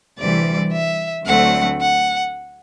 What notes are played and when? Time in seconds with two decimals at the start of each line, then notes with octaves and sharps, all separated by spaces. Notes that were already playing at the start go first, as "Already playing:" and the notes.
0.18 D2 C3 E3 G3 D5
0.72 E5
1.26 D2 D3 F#3 A3 C4 F#5
1.81 F#5